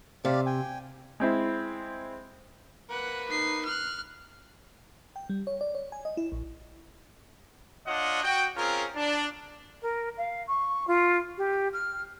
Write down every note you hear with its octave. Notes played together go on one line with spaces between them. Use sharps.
C3 G4 D5 F5
G5 G#5
G#3 C4 E4
A#3 B4 F#5
D#4 C7
F6 F#6
G5
G3
C#5
D5
C#5
G#5
D#5
E4
A#1
D4 F4 C#5 D#5 F#5
F#4 G5
C4 C#4 F4 G#4 A#4
D4
A#4
F5
C#6
F4
G4
F6